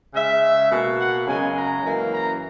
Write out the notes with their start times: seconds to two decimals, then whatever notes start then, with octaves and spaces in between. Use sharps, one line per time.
0.14 C#3 G#3 E5
0.71 B2 A#3
0.99 F#5
1.27 F#2 C#3 G#3 G#5
1.55 A#5
1.84 F#2 E3 A#3
2.11 A#5